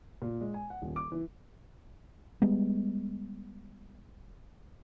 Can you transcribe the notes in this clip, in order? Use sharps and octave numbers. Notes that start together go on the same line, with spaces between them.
A#2
G#3
G#5
F#5
D#1
D6
E3
G3 G#3 B3